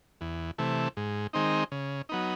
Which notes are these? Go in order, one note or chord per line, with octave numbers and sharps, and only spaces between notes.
E2
C3 E3 A3
G#2
D#3 G#3 C4 D#4
C#3
F#3 B3 D#4